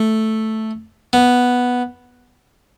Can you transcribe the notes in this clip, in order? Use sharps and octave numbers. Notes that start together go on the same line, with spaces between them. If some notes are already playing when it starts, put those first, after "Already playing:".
Already playing: A3
B3